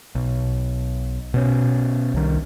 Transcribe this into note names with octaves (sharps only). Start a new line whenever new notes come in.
B1
B2 C#4
C2 D#3